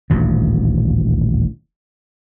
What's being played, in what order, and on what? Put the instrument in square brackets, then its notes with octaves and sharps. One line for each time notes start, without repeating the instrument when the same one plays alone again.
[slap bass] D#1 A1 D2